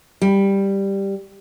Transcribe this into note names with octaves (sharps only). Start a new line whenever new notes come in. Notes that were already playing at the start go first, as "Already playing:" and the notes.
G3